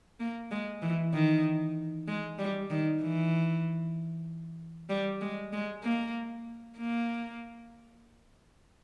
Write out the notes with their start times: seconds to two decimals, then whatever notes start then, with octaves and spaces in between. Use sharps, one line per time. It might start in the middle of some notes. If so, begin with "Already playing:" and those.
0.20 A#3
0.51 G#3
0.82 E3
1.14 D#3
2.08 G#3
2.39 G3
2.70 D#3
3.02 E3
4.89 G3
5.21 G#3
5.53 G#3
5.83 A#3
6.78 A#3